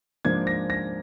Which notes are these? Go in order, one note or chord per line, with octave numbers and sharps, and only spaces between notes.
G#2 F3 A#3 D4 G#6
A#6
A#6